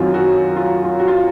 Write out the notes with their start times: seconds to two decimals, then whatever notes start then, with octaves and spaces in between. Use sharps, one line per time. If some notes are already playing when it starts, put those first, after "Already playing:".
Already playing: F#2 D#3 F#3 C4 F4 F#4
0.14 F#4
0.56 F4
0.84 F4
1.00 F#4
1.08 F4